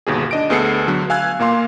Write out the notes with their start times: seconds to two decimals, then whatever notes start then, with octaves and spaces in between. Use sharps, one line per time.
0.07 G1 D#2 B2 G#4
0.31 D4 D#5 D7
0.50 D2 B3 G#4 A4 C7 C#7
0.88 D3 F#3 B3
1.10 F5 G#5 E6 F#6 G#6
1.39 A#2 A#3 F5 C6